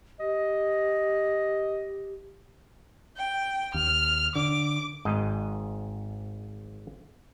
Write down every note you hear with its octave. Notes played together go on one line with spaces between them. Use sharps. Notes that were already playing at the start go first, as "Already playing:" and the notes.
G4 D#5
G5
D#2 F6
D3 D6
G#1 G#2 D#5